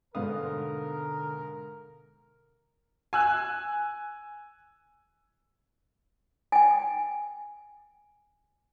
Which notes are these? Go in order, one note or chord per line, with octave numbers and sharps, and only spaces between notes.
G#2 B2 D3 B3 A#4 F5 D#6
G#5 E6 F#6
G5 G#5